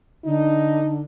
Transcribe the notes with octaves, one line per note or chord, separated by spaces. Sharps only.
D3 D#4